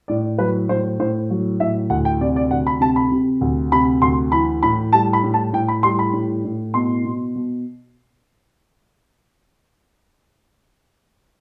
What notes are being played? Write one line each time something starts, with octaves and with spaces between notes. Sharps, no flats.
A2 D5
F#3 B4
A2 C5
A2 C5
F#3
A2 E5
D2 F#5
G5
C3 D5
D5
D2 F#5
B5
C3 A5
B5
C3
D2
C3 B5
D2 C6
E3 B5
A2 B5
G3 A5
B5
A2
A5
A2 G5
B5
G3 C6
B5
A2
A2
B2 C6
B2
B2